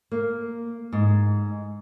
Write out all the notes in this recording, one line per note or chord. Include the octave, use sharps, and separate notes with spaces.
A#3
G#2